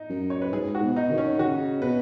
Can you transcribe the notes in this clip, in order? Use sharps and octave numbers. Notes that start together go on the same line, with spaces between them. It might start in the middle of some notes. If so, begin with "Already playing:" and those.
Already playing: D#4
F#2
C#5
B4
G#2 G#4
F#4
B2
D#4
D#3
C#4
C#3 F#4
B2 B4